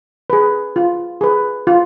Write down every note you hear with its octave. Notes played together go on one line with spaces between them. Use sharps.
G#4 B4
F4
G#4 B4
F4